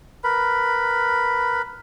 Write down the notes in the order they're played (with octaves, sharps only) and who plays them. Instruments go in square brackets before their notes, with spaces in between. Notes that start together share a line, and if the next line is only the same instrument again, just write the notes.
[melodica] A#4 B4 B5